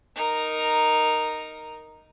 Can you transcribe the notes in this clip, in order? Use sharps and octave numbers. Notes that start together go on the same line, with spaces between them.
D#4 A#4